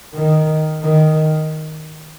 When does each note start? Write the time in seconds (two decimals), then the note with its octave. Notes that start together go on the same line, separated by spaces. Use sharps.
0.14 D#3
0.82 D#3